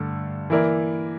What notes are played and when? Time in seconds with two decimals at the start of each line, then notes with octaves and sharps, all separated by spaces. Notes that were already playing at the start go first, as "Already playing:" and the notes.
Already playing: G2 D3 A3 A4
0.50 E3 A#3 E4 A#4 D5